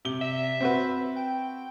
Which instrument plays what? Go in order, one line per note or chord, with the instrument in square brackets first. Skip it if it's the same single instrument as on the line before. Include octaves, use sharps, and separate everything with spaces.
[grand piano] C3 G7
[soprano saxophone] E5
[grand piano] C4 F#4 B4
[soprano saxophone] G5